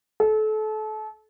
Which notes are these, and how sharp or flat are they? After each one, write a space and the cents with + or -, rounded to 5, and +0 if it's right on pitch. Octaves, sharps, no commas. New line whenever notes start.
A4 -30